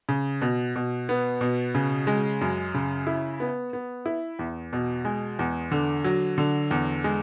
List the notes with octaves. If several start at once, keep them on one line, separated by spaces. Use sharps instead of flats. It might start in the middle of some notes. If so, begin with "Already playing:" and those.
C#3
B2
B2
B3
B2
C#3
G#3
F#2
C#3
E4
B3
B3
E4
E2
B2
G#3
E2
D3
F#3
D3
E2
G#3